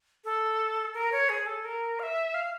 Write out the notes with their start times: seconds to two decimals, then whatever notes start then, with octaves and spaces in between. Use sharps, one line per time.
0.24 A4
0.94 A#4
1.12 C#5
1.29 G#4
1.46 A4
1.65 A#4
1.99 F5
2.03 E5
2.34 F5